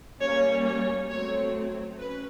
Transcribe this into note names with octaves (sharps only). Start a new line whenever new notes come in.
G3 A#3 C#4 C#5
C#5
F#3 A3 C4 C#5
C#4 B4